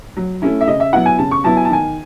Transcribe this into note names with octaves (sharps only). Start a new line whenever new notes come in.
F#3
A3 C#4 E4
E5
C#3 D#5
E5
F#3 B3 E4 F#5
G#5
C#3 A5
C#6
F#3 B3 E4 A5
G#5
A5
D#3 G#5